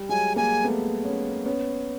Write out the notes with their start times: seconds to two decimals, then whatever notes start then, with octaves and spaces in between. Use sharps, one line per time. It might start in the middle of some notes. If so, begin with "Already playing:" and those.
Already playing: G3
0.09 F#3 G#3 G#5
0.36 G#3 A#3 G#5
0.64 A3 B3
1.04 B3 C#4
1.45 B3 C#4